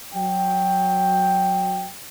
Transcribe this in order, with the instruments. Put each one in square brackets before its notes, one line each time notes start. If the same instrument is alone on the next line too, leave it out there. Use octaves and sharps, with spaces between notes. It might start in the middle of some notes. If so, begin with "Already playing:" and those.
[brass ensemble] F#3 G5